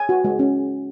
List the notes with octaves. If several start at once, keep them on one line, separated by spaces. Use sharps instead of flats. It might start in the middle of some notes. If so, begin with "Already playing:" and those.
Already playing: G#5
F#4
G#3
C#4